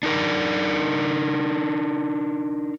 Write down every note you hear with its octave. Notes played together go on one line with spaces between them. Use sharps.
D4 D#4 A#4 D5